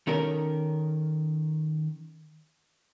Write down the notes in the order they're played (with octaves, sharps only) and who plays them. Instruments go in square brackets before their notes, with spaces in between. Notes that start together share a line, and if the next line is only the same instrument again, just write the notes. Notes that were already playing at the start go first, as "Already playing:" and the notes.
[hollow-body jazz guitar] D#3 C#4 A4 A#4